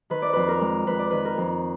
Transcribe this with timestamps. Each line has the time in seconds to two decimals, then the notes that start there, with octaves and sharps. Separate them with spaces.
0.10 D#3 B4
0.22 D5
0.33 F2 B4
0.48 A#4
0.61 G#3
0.87 F2 B4
0.99 D5
1.11 D#3 B4
1.25 A#4
1.37 F2